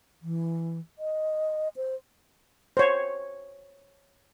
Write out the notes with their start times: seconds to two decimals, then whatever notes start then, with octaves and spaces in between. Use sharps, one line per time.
0.22 E3
0.99 D#5
1.76 C5
2.77 C5 C#5